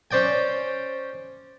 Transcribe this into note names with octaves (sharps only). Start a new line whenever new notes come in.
C#4 C5 D5 G5 G#5